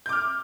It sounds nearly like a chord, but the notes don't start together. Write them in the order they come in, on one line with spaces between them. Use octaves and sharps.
G6 D6 F6